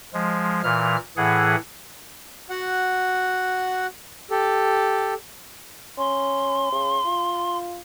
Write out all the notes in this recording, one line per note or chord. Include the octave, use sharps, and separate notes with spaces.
F3 G#3
A#2 E3 F6
A2 E3 G#4 F#5
F#4 F#5
G4 A4
C#4 C6
C#3
F4